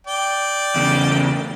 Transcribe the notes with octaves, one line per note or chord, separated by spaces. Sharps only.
D5 G5
E2 C#3